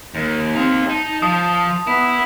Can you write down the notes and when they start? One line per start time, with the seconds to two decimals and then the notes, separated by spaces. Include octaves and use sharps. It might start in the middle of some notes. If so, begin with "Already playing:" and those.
0.15 D#2
0.55 C4 D#4 F5
0.89 D#4 A5
1.22 F3 D#6
1.87 B3 E4